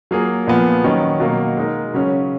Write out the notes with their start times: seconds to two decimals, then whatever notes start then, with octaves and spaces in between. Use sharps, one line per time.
0.11 F#3 A#3 F4 G#4
0.47 A#2 F3 B3
0.84 D#3 F#3 C#4
1.20 B2 F#3 A#3
1.57 G#3 D#4 A#4
1.94 C#3 F#3 C#4